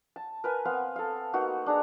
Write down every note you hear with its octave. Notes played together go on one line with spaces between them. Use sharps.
A5
A#4 B4 G#5
B3 C4 F5
A4 F5
A#3 B3 D#4 F#4
D4 G#4 A#5